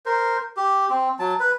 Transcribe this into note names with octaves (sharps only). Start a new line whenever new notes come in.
A#4 C5
G4
C4
F#3 A5
B4